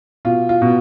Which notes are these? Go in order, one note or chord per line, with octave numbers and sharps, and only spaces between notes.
B2 F4
F4
B2